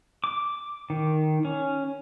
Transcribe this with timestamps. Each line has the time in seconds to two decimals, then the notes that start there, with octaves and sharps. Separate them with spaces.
0.24 D6
0.90 D#3
1.45 C#4